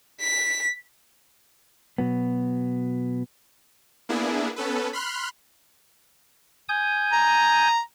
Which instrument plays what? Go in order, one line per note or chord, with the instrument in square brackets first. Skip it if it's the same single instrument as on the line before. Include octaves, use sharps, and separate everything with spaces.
[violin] B6
[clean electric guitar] B2 F#3 B3
[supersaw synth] A#3 B3 D4 E4 G#4
B3 C#4 A4 B4
B5 C6 F6 F#6
[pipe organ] G#5 D#6 G6
[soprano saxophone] A#5